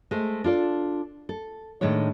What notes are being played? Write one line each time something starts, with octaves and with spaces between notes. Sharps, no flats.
G#3 A3 C5
D4 F4 A4 D5
A4
A2 D#3 G#3 D4 C#5